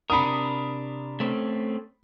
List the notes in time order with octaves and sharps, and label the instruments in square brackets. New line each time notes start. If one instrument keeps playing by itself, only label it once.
[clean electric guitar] C3 D4 A#4 [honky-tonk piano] B5 D#6
[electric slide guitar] A3 C4 C#4